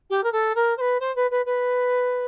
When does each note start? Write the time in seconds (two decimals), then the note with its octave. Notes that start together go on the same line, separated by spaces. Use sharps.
0.10 G4
0.23 A#4
0.32 A4
0.55 A#4
0.77 C5
0.81 B4
1.00 C5
1.16 B4
1.30 B4
1.45 B4